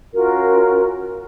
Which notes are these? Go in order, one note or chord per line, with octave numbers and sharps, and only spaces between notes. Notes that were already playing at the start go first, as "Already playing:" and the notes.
C#4 F4 F#4 A#4